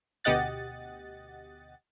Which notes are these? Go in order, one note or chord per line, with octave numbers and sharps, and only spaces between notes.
D2 B2 G4 D#5 F#5 A6